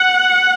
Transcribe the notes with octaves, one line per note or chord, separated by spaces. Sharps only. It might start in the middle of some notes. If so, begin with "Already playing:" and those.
Already playing: F#5